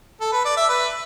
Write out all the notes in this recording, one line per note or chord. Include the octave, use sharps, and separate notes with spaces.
A4
B4
D5
E5
B4